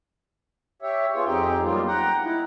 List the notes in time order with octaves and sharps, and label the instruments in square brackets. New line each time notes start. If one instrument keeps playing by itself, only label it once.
[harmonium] G4 C#5 E5
B3 F4 G#4 C#5
F2 C4 D#4 G4 G#4 G5
F#3 G3 A#3 B3 D#4 F4
F#5 G5 A#5
D#4 E4